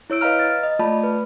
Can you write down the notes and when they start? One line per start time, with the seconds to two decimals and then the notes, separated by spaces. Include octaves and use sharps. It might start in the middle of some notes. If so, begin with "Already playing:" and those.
0.10 E4 C#5 E6 D7
0.21 B4 D#5 F5 A#5 F6
0.39 A6
0.63 D#5
0.79 A3 F4 D5 A5 B5
1.03 B4